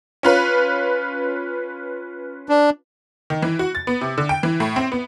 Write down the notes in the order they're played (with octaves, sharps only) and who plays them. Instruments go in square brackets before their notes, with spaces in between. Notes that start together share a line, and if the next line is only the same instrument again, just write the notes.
[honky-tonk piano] C#4 F4 B4
[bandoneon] D4
[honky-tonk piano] D#3
E3
F#4
A6
B3
C3
D3
G5
E3
A2
C4
B3